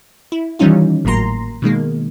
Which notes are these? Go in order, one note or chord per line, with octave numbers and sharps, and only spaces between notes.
E4
D#3 E3 G3 C#4 D#4 F4
G#1 A2 F#3 A#3 A#5 C6
B2 D#3 G#3 A#3